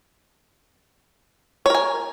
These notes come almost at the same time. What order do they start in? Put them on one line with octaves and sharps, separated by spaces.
C#5 A#4 G#5